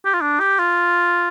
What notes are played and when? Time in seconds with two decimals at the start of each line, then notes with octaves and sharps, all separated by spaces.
0.06 G4
0.14 F4
0.21 D4
0.40 G4
0.59 F4